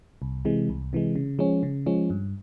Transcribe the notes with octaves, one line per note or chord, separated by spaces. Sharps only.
C2
C3 E3 G#3
C2
C3 E3 G#3
C#3
F3 G#3 C#4
C#3
F3 G#3 C#4
G2